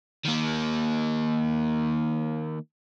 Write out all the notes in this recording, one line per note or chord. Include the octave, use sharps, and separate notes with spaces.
D#3 A#3